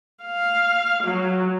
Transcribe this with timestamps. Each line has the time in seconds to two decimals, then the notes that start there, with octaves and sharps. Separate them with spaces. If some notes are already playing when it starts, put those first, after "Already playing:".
0.25 F5
1.02 F#3